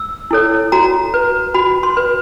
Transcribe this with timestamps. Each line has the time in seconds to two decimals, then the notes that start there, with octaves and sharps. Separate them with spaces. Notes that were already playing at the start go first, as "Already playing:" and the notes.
Already playing: E6
0.31 E4 A4 C#5
0.72 F#4 A#5
1.14 B4
1.54 F#4 B5
1.83 C6
1.97 B4